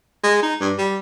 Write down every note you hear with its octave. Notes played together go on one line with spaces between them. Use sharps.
G#3
D#4
G2
G3